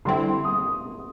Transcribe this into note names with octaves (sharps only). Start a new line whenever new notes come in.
D3 G3 C4 E4 C6
D#6